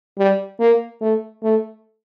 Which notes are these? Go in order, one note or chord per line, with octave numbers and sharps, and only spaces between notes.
G3
A#3
A3
A3